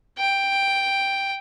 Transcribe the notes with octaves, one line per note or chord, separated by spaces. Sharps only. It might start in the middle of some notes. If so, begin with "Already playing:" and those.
G5